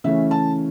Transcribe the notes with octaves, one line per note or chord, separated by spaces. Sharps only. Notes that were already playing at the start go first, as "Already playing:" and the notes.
C#3 E3 A3 C#4 E5
A5